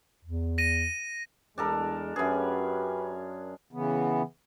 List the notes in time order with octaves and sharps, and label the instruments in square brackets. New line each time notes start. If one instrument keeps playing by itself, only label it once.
[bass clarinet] E2
[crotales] A#6 D#7
[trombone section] E2 G#3 [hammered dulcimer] D4 A4 A#4
[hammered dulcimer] F#2 G#4 [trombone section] C#4 G4 B4
[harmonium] C#3 E3 B3